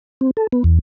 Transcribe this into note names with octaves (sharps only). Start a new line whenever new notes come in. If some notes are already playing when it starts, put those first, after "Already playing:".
C4
A4
B3
E2